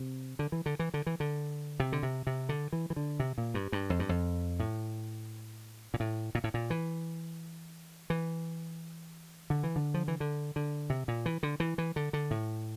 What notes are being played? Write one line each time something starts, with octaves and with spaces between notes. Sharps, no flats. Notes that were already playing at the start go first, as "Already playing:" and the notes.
Already playing: C3
D3
E3
D3
E3
D3
E3
D3
C3
D3
C3
C3
D3
E3
E3
D3
C3
A#2
G2
G2
F2
G2
F2
A2
A#2
A2
A#2
A2
A#2
E3
E3
D3
E3
D3
F3
E3
D3
D3
C3
A#2
E3
D3
E3
E3
D3
D3
A2